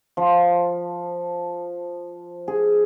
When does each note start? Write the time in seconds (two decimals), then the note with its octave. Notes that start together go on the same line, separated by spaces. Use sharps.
0.17 F3
2.48 G#4